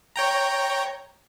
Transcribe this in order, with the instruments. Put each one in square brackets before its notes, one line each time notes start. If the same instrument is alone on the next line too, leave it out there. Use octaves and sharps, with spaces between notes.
[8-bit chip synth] C#5 G5 A#5